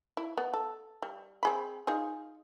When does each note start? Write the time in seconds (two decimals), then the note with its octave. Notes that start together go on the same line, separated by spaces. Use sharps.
0.17 E4
0.37 B3
0.53 A4
1.02 G3
1.43 C4 G#4 B5
1.87 D#4 F4 G#4